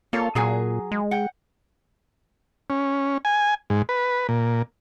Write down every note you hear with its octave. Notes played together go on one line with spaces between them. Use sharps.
A#3 F4 A4 C#5
A#2 F#3 G#4 G#5
G#3
F#5 G5
C#4
G#5
G#2
B4
A#2